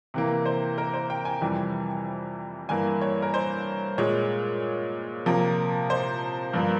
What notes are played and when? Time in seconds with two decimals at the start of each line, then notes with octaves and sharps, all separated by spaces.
0.14 C3 E3 A#3
0.46 C5
0.78 A#4
0.94 C5
1.10 G5
1.25 G#5
1.41 F2 C3 E3 G3
2.69 G2 E3 A#3 G#5
3.01 C#5
3.22 A#4
3.34 C5
3.98 A#2 G#3 C#5
5.26 C3 F3 A#3
5.90 C5
6.53 G2 F3 A#3